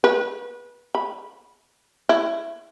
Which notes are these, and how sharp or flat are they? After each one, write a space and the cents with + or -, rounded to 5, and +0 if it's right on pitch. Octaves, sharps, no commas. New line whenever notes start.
B4 -25
B5 -15
E4 +15